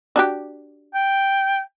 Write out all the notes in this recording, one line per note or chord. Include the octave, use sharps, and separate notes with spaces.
D4 F#4 G4
G5